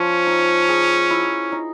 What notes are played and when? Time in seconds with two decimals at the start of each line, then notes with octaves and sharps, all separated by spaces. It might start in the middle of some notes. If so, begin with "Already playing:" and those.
Already playing: F3 C#4
0.27 D#4
0.69 G#4
1.10 E4
1.52 D#4